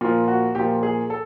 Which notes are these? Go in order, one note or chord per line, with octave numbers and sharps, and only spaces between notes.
A#2 F3 F4
F#4
A#2 F3 G4
G#4
A4